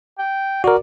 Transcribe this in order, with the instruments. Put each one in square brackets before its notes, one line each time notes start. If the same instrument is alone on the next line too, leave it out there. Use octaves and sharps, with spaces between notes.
[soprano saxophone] G5
[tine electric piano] F#4 A#4 [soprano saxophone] D5